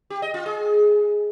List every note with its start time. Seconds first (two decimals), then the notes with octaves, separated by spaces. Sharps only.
0.10 G4
0.22 D#5
0.34 F4
0.46 G#4